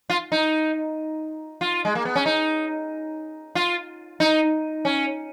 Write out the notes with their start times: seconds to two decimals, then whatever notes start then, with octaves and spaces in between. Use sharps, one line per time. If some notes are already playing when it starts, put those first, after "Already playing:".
0.10 F4
0.32 D#4
1.61 F4
1.85 G#3
1.95 A#3
2.05 B3
2.15 C#4
2.26 D#4
3.55 F4
4.20 D#4
4.85 C#4